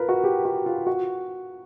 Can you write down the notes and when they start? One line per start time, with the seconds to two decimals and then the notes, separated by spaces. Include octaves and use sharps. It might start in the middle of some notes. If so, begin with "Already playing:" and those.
Already playing: F4 A#4 B4
0.09 F#4
0.24 G4
0.45 F#4
0.66 F4
0.86 F#4